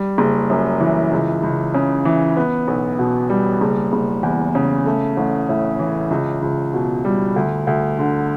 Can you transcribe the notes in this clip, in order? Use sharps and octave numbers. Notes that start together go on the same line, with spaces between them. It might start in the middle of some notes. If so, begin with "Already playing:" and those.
Already playing: G3
F#1
F#2
E3
C#2
C#2
C#3
E3
B3
B1
B2
G3
F#1
F#1
E2
C#3
A3
A1
A2
E3
C#2
C#2
B2
G3
D2
D2
D3